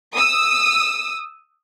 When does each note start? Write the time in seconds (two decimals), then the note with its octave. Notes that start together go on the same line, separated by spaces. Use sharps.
0.15 D#6 E6